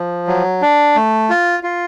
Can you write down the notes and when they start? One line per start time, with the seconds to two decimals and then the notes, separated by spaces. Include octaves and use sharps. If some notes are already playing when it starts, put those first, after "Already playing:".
Already playing: F3
0.27 F#3
0.62 D4
0.96 A3
1.29 F4
1.63 F4